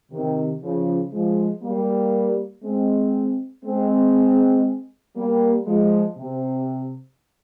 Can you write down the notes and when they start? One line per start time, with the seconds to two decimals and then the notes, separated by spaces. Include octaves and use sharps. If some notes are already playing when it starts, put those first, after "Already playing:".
0.11 C3 D#3
0.62 C#3 F3
1.12 F3 G#3
1.63 G3 A#3
2.64 G#3 C4
3.65 G#3 C4
5.16 G3 A#3
5.67 F3 G#3
6.17 C3